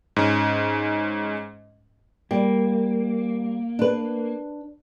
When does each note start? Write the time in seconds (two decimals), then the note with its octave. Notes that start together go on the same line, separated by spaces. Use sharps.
0.16 G#2 C#4
2.31 G3 A#3
3.79 D4 B4